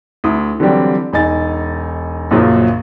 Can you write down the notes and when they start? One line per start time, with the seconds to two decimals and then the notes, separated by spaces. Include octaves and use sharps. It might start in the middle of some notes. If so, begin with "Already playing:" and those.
0.24 D2 E4 D#6
0.60 D3 E3 F#3 G3 C4 D4
1.13 E1 D#4 G#5 A6
2.31 A#1 F#2 A#2 C#3 F3 F#3